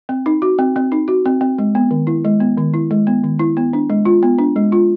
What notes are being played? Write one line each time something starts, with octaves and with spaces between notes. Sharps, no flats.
C4
D#4
F#4
C4
C4
D#4
F#4
C4
C4
G#3
B3
D#3
E4
G#3
B3
D#3
E4
G#3
B3
D#3
E4
B3
D4
G#3
F4
B3
D4
G#3
F4